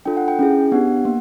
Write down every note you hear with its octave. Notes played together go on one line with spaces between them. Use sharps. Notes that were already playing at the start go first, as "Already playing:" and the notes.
D4 F4 A4 G5
F#5
G5
C#4 E4 G#4
B3 D4 G4 F#5
A#3